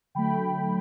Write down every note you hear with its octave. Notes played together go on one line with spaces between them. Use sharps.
D3 F#3 A3 G5 B5